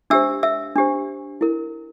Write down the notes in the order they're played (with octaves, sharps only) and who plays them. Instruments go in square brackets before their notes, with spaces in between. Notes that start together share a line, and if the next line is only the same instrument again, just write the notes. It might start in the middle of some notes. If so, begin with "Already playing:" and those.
[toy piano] D4 G4 C5 E5 E6
E5 E6
D4 G4 C5
E4 A#4